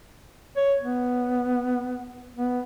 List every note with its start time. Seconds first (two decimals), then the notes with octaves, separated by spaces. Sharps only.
0.57 C#5
0.81 B3
2.37 B3